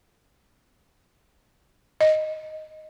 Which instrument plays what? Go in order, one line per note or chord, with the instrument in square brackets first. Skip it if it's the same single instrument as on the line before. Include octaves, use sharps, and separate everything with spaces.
[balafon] D#5